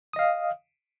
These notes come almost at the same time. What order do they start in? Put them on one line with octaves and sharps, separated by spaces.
D#6 D#5 F5